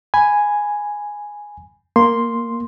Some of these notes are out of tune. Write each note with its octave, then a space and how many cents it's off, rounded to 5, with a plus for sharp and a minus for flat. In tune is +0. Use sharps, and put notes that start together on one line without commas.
G#5 +0 B5 +0
A#3 -5 C6 +0